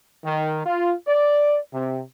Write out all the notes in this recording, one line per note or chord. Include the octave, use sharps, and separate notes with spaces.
D#3
F4
D5
C3